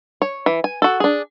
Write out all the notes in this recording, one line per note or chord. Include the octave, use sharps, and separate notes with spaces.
C#5
E3
G#5
F#4 A4
D4 G#4